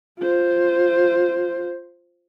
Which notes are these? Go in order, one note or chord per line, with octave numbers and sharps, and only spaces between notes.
F4 C5